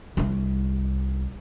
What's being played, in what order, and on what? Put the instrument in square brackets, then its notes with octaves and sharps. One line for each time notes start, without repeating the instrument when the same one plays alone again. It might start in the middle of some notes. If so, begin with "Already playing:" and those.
[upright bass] C2 C4